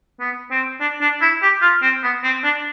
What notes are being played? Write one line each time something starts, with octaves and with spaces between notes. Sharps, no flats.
B3
C4
D4
D4
E4
G4
F4
C4
B3
C4
D4